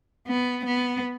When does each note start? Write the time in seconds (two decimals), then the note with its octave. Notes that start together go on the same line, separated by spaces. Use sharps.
0.28 B3
0.66 B3